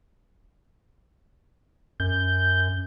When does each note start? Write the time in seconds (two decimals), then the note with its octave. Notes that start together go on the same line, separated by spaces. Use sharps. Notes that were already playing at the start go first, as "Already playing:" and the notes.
2.00 F#2 G6